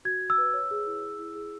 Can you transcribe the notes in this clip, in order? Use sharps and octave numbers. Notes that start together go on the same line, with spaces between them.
F#4 G#6
F#4
E6
B4
C#5
G#4
E4
G#4
E4
G#4